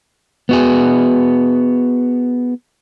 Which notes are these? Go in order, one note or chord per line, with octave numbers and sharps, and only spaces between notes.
B3 F#4 G#4